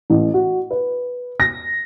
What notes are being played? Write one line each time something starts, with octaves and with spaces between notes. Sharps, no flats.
A1
F#4
B4
A#6